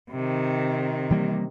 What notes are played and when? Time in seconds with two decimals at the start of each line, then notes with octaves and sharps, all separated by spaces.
0.11 C3 D#3
1.10 E3 G3 A#3